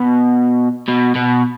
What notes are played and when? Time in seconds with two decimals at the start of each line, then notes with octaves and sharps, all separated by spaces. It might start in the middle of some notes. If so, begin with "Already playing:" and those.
Already playing: B2
0.88 B2
1.16 B2